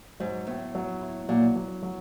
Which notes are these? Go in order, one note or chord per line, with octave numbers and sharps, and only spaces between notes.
G#2 F#3
A2 B3
F#3
E4
A#2 F#3
F#3
F#3